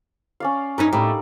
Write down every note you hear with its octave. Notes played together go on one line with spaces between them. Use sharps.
C#4 D5 F5
G2 C#4 D#4 A#4
A2 G3 D#4 D5